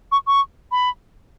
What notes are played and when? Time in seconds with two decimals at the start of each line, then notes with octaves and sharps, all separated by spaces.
0.12 C#6
0.27 C#6
0.72 B5